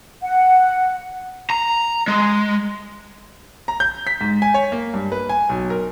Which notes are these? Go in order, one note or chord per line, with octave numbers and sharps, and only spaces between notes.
F#5
A#5
G#3
A#5
G6
B6
G#2
G#5
C#5
A#3
G2
B4
G#5
B1
A#4